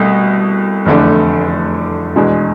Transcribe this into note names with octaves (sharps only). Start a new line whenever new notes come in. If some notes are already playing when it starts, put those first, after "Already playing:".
Already playing: C2 B2 A3
F1 E2 D3 A3 D4
E2 B2 G#3 D4